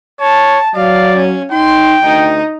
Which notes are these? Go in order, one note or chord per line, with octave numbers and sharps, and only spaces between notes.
C#5 A5
F#3 D5 F5
C#4
D#4 G5 C6
D2 D#4